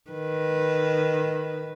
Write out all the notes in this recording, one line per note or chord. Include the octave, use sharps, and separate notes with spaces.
D#3 B4